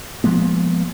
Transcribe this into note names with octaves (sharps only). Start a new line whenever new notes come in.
F3 G#3 A#3 B3